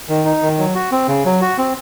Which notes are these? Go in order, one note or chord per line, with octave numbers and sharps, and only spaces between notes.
D#3
D#4
D#3
F#3
F#4
C4
C#3
F#3
F#4
C4